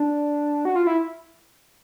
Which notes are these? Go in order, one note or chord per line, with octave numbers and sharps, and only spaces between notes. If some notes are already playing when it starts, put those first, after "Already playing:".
Already playing: D4
F#4
F4
E4